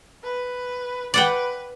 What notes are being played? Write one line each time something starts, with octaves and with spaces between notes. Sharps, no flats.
B4
B4 D5 F#5 G5